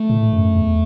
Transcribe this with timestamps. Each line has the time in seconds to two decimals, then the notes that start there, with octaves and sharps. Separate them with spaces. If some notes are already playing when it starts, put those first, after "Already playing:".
Already playing: A3
0.10 A2
0.33 F#2
0.56 E2